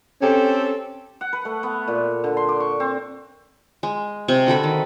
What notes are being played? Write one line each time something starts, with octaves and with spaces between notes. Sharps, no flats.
C4 C#4 G4 A4
F#5
B4
A3
B3
A#2
D3
C6
D6
C#6
C4
G#3
C3 C#6
D3 F#4 A4 B5
D#3